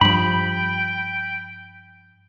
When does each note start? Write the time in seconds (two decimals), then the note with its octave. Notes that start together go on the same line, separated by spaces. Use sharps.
0.01 G2 F3 G5 B5